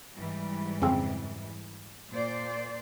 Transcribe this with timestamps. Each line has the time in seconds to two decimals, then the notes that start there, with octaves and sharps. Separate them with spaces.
0.15 G#2 E3 G3
0.82 F2 C#3 C4
2.10 A#2 C5 D5